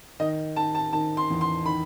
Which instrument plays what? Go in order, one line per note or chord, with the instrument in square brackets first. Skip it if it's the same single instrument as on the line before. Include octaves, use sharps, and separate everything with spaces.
[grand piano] D#3 D#5
D#3 A5
A5
D#3 A5
C6
E2
C6
D#3 B5